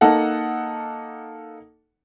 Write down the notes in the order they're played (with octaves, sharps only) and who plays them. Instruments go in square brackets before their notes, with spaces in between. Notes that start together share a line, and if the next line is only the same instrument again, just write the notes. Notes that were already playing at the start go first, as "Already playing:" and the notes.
[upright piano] A#3 D#4 A4 F#5